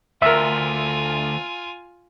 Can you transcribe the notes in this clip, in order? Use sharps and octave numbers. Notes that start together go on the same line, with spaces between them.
D2 F4 A#4 E5 G#5